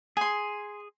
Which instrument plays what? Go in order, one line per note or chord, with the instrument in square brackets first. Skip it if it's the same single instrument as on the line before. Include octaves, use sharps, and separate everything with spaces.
[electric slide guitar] G#4 [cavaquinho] G#5 C6